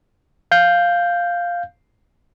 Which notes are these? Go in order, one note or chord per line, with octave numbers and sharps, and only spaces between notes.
F5 G6